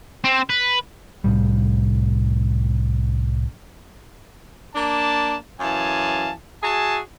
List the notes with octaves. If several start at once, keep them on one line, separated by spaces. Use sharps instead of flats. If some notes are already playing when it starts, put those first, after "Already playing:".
C4
B4
C2 A2 G3
A#3 D4 A5
F#2 E3 F5 G#5 A5
F#4 G#4 E5 G#5 A5